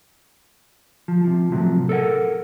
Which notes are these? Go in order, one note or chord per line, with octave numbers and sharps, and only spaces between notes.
F3
C3 F3
A2 C3 F3 F#3
A4 A#4 D5 F#5